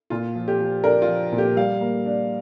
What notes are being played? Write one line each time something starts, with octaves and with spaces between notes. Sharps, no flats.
A#2 F4
F3
G4
F3
D4 A#4
F4
F3
A#2
G4
G3 F5
A#3
D4